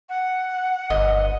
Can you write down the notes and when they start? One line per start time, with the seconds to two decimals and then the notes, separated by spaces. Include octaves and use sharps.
0.09 F#5
0.90 G1 D#5